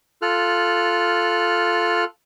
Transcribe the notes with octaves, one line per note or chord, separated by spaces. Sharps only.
F4 A4 F6 F#6